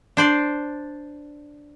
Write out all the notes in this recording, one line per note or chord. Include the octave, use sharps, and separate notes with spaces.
D4 C5 D5